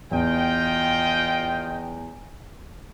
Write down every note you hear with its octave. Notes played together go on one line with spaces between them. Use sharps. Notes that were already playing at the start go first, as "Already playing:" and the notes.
E2 F4 D#5 G5